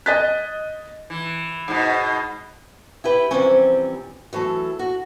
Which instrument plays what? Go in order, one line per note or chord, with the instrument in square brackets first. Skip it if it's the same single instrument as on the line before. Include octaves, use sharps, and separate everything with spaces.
[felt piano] D#5 A6 B6 [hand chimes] F#6
[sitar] E3
G#2 B2
[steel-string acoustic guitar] E4 G4 B4 G5
C3 E3 F3 G3 C4 C#4
E3 F#3 A3 A4
F#4